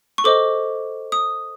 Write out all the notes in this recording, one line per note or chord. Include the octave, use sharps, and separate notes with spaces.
C#6
A4 C5 D#5 D6
D#6